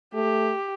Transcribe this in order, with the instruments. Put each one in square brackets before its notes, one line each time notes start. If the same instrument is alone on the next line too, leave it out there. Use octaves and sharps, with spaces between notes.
[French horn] A3 [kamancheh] G4